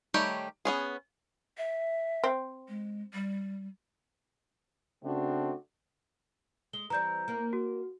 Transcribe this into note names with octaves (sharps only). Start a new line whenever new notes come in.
D#3 G3 A3 G4 C#5
B3 C#4 G#4
E5
C4
G#3
G3
C#3 A3 C4 D4 F#4
G#3 G7
E3 G3 C4 A#5 G6
A#3 A#4
F#4